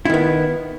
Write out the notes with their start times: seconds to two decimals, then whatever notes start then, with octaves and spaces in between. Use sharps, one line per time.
0.05 E4
0.10 D#3
0.14 B3